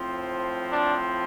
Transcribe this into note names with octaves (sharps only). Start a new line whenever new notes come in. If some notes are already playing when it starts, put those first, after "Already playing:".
Already playing: A2 F3 C4
D4